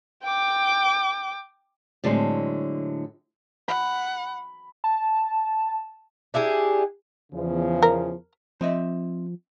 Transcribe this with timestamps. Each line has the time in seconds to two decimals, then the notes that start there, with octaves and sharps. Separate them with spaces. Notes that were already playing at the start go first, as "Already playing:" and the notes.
0.23 G5 D6
2.04 A2 D3 F#3 G#3 C4
3.68 F#5 B5
4.84 A5
6.34 D4 E4 G4 G#4
7.33 E2 C#3 F3
7.82 A#4
8.61 F3 C4 D#5 E5